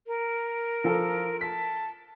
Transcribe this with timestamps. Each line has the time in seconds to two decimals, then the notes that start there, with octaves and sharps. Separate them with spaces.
0.07 A#4
0.84 F3 A4
1.41 A5 B6